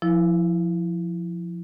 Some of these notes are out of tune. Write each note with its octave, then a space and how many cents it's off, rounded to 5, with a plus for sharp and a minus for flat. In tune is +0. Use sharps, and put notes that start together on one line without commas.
F3 +0 E4 +0